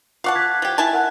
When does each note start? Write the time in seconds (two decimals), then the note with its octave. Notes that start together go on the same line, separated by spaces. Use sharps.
0.24 F4 F5 F#5 A5 C#6 D6
0.35 F#6 G#6 B6
0.62 F3 G4
0.78 E4 G#5 A5
0.93 A#4 F#5 F#6